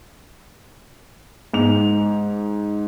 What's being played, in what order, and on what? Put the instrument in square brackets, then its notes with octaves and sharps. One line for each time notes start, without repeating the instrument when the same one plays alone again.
[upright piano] G#2 F7